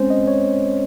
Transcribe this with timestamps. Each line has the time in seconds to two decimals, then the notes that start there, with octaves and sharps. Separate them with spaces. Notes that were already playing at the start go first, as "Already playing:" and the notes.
Already playing: G#3 C4 C#4 C5
0.10 D#5
0.28 C#5